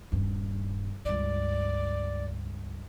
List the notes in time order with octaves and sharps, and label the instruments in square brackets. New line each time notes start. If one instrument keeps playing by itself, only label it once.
[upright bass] D#1 G2
[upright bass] C#2 G2 [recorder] D5